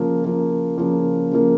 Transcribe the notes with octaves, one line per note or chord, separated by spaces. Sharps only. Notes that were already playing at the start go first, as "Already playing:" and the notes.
Already playing: C#3 F3 A#3
C#3 F3 A#3
C#3 F3 A#3
C#3 F3 A#3